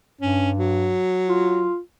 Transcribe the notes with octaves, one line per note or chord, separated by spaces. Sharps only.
G2 C#4
F#3
F4